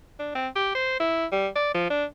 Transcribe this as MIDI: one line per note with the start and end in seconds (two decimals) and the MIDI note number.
0.19 0.32 62
0.36 0.48 60
0.56 0.72 67
0.75 0.98 72
1.00 1.26 64
1.32 1.48 55
1.56 1.72 74
1.74 1.90 53
1.90 2.05 62